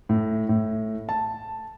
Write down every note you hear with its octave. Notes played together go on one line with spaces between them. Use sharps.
A2
A2
A5